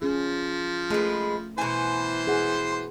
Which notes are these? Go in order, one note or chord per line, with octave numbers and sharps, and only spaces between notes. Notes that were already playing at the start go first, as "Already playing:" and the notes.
F3 C#4 G#4
G#3 A3 B4
B2 E3 C5 G#5 C6
G#4 F#5